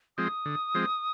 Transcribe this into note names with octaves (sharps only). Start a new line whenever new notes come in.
F3 G#3 C4 D#6
D3
F3 G#3 C4